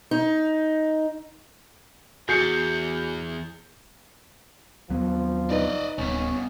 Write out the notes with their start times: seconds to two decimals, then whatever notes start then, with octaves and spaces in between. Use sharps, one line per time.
0.11 D#4
2.29 E2 F#4 G#4 G6 C7 C#7
4.90 D#2 F3 F#3 B3
5.50 D#4 B4 D5 D#5
5.98 D1 C2 B3 C#4